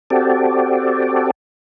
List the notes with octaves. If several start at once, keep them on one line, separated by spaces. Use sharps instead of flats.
C4 F#4 G4 A4 D5